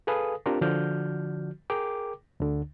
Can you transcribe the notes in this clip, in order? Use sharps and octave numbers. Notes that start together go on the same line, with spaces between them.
G#4 A4 B4 F5 G#5 D#6
C4 D4 F4 G4 A#4
D3 F3 F#4 D5 F6 G6
G#4 A#4 G5 D6
D2 D3